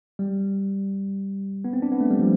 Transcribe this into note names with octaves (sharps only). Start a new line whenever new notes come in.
G3
B3
C4
D4
B3
A3
G3
F3